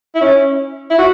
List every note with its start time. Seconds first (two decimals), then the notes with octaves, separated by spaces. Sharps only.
0.15 E4
0.21 C#4
0.90 E4
0.98 F#4